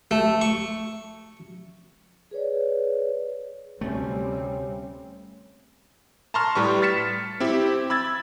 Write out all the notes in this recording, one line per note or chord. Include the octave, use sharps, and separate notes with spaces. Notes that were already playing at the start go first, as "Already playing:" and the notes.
A3
C#6
G#4 B4 C#5 D5
D2 C3 G3 A3 C4 C#4
A5 A#5 C6 C#6 F6
A2 G3 B4 C#6
F6 A6 B6 C#7 E7
C4 E4 G4
B5 E6 G#6 A6